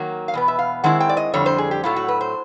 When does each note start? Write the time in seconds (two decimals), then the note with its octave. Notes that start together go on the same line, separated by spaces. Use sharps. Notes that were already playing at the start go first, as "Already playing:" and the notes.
Already playing: D#3 F#3 A#3
0.28 F5
0.34 E2 B2 B3
0.48 E5
0.59 F5
0.84 D#3 G#3 C4 E4 F#5
1.00 G5
1.09 D5
1.17 D#5
1.33 F2 D3 G3 C#5
1.46 C5
1.58 G#4
1.71 G4
1.84 A2 F#3 A3 F4
1.96 F#4
2.08 B4
2.21 C5